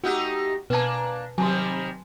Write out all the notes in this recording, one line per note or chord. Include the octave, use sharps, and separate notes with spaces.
A3 D#4 F#4 G4 F#5
B2 A#3 D4 B4 G#5 A5
C3 D#3 F#3 G3 G#5 A5 C6